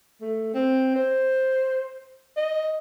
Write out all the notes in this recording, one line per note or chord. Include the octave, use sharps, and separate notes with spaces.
A3
C4
C5
D#5